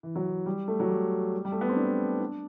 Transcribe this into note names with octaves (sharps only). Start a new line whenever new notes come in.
E3
F#3
E3
G3
A3
F#3
G3
G3
A3
B3
C4
D4
D4